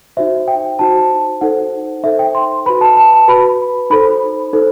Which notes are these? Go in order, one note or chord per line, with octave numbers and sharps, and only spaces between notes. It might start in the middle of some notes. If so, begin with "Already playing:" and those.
D#4 F#4 C5 E5
G5
D#4 F#4 C5 A5
D#4 A4 C5 F#5
D#4 A4 C5 E5
G5
C6
F#4 B4 B5
A5
A5
A5
F#4 B4 B5
D#4 A4 C5 B5
D#4 A4 C5